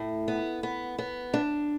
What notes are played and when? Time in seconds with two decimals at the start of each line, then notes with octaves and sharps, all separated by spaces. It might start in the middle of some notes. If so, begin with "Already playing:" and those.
Already playing: A2
0.28 B3
0.63 B3
0.98 B3
1.34 D4